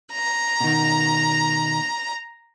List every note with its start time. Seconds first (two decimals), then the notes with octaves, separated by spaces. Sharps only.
0.11 A#5
0.60 B2 D#3